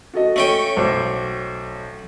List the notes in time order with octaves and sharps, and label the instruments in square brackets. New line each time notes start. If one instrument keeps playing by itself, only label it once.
[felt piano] F#4 A4 D#5
[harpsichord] A3 C#4 G5
[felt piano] B1 C5 D6